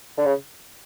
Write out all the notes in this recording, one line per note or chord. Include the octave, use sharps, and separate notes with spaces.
D3
C#3